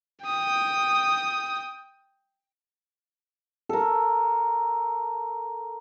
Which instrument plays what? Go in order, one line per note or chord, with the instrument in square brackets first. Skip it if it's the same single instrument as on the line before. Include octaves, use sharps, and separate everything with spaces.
[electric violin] G5 D#6
[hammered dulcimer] A4 A#4